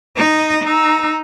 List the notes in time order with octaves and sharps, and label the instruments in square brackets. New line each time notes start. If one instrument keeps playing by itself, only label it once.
[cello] D#4 D#5
[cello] D#4 [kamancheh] A#5 E6